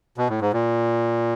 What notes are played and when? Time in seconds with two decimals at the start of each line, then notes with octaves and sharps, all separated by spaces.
0.17 B2
0.29 A2
0.41 G#2
0.53 A#2